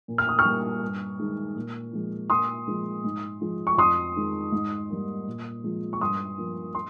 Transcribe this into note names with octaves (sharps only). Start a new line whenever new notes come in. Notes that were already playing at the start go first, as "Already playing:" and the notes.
A#2
F6
D#6
C#6 F6
G3 A#3
G2
D#3 G#3
A#2
F3 G#3
A#2 C6 D#6
F3 G#3
G#2
F3 G#3
C#6
F2 C6 D#6
D#3 G#3
G#2
G3 A#3
A#2
F3 G#3
C#6
G2 C6 D#6
F3 A#3
C6